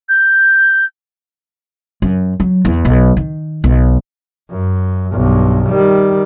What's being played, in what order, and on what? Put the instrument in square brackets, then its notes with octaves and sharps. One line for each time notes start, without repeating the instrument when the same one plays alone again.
[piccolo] G6
[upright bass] F#2
F#3
E2
B1
D#3
B1
[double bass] F#2
B1 G2
D#3 G3